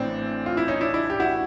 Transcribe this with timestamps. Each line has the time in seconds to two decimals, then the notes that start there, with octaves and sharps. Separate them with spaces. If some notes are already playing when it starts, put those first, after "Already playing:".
Already playing: A1 A2 E3 C4 D4
0.46 F4
0.57 E4
0.68 C#4 D#4
0.81 D4 E4
0.94 D4 E4
1.10 G4
1.20 E4 F#4